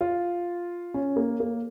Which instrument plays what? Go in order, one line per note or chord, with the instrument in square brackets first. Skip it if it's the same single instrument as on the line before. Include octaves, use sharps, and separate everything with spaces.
[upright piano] F4
C#4
A#3
A#3